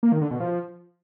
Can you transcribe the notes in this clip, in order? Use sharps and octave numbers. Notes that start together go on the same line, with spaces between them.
A#3
D#3
D3
B2
F3